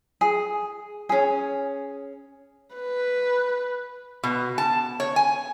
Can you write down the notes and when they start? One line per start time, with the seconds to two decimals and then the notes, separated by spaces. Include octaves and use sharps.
0.21 G#4
1.09 C#4 G#4
2.75 B4
4.24 B2
4.58 A5
5.00 C#5
5.16 G#5